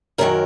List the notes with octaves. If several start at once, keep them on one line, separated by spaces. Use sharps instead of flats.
F#2 D#3 F#3 A#4